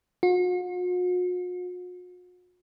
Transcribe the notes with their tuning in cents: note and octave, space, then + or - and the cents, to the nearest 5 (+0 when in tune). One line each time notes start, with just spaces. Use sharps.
F#4 -45